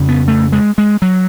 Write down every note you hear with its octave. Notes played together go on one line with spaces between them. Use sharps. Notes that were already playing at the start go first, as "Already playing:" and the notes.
Already playing: F2 C#3
B3
A3
G#3
G#3
F#3